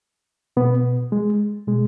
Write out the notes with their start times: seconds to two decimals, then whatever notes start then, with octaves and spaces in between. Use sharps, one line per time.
0.57 B2 B3
1.12 G#3
1.68 B2 G#3